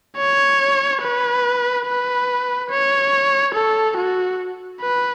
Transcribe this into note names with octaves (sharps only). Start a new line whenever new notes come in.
C#5
B4
B4
C#5
A4
F#4
B4